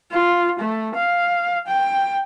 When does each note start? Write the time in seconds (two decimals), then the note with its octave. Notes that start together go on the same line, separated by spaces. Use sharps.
0.12 F4
0.59 A3
0.95 F5
1.67 G5